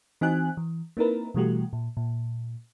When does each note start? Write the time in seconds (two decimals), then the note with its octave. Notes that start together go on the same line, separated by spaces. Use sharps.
0.21 E3 C4 D#4 F#4 G#5 F#6
0.57 E3
0.97 A#3 C4 D#4 E4 A#4 B4
1.34 B2 E3 G3 A3 F#4 G4
1.73 A#2
1.97 A#2